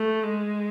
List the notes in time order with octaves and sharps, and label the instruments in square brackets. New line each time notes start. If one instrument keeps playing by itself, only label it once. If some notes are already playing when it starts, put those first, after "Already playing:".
Already playing: [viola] A3
G#3